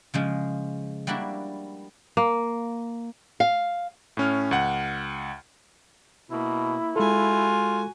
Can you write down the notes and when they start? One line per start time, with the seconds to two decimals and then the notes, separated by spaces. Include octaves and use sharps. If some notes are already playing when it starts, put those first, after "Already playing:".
0.14 C#3 F3 G#3
1.07 G3 A#3 D4 E4 F#4
2.17 A#3
3.40 F5
4.17 A2 C#4 F6
4.51 C#2 F#5
6.31 B2 A#3 E4
6.96 G#3 F4 F#4 A4 G#5